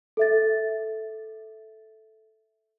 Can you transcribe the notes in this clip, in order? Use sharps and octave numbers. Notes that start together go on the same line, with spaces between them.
A4 E5 A6